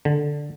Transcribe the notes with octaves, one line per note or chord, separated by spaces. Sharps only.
D3